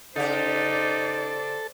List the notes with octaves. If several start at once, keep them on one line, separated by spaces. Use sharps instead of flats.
C#3 D#4 G4 A4 C5 D5